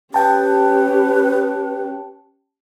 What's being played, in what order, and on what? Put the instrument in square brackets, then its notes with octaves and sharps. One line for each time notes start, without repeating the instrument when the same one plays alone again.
[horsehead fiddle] C#4 G4 [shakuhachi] B4 [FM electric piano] G5 A5